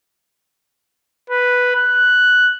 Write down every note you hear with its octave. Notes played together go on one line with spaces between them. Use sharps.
B4
F#6